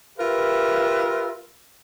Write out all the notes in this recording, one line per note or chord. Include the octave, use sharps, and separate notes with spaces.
F4 G4 A#4 B4 E5